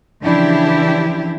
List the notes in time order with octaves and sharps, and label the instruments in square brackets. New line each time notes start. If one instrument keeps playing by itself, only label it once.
[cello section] C#3 E3 F3 D4 E4 G4